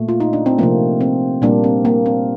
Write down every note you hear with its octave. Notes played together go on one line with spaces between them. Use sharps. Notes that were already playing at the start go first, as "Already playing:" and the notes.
Already playing: A#2 A3
F4
D#4
D4
C4
C3 F3 A3 A#3
C4
A#2 G3 A#3 D4
C4
A#3
C4